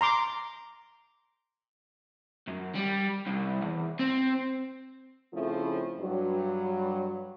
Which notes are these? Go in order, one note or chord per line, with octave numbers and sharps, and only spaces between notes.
A#5 C6 D6
F#2
G3
C2
E2
C4
C#3 F3 A3 C4 E4
G2 F#3